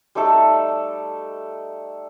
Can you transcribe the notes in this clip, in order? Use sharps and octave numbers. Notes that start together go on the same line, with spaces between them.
G3 A3 D#4 A4